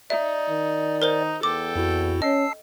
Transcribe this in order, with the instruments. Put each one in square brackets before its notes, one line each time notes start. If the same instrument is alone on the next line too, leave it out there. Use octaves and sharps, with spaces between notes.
[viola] D#4 [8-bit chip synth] D5 [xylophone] E5
[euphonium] D#3
[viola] D#4 [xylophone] A#4 C5 G7
[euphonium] E2 [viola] A4 G5 [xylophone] D6
[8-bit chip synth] F2 E4 F#4
[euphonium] C#4 [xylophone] D#5 [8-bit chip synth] A5 E6 C7